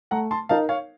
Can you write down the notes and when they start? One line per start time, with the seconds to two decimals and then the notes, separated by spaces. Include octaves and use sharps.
0.11 A3 F#5 A#5
0.31 A5 C6
0.49 D#4 A#4 F5 A5
0.69 C#5 F5